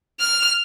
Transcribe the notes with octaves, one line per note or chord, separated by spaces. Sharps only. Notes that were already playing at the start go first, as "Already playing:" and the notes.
F6